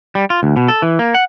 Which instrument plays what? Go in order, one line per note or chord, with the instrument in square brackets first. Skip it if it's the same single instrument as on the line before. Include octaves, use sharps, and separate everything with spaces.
[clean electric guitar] G3
F4
D2
B2
A4
E3
A#3
F#5